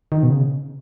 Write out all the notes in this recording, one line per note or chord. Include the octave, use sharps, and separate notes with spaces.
D#3
B2
C#3